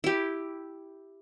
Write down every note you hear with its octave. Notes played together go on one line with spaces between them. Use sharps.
E4 G4